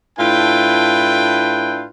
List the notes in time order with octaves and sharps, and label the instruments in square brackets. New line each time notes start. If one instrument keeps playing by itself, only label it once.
[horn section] A2 D4 E4 F4 B4 G5